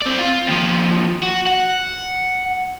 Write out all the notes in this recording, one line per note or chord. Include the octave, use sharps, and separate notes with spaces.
C4 D5
F4
D#2 F3
F#4
F#5